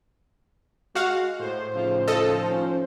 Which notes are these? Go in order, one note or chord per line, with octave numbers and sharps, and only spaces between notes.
G#3 F#4 F5 F#5
A2 C5
G#2 C#3 F3
D#3 F3 A4 D#5
C#4